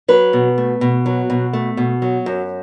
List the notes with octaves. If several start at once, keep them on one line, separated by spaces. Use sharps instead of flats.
F#3 B4
B2
A3
B2
F#3
B2
A3
B2
F#3
F#2